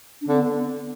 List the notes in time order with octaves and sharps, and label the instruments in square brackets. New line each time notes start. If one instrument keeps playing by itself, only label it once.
[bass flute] D4
[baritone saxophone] D3 [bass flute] C4
[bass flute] B3